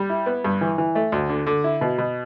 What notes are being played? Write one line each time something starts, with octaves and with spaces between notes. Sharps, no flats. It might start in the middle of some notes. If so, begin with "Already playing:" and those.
Already playing: G3
E4
B3
G2
E3
E3
A3
D2
D3
D3
E4
B2
B2